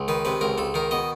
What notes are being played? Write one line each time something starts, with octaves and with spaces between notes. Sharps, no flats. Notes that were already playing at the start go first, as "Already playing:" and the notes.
Already playing: C#2
D#3 B4
C3 B4
C#2 A#4
C#2 A4
D#3 A#4
B2 D#5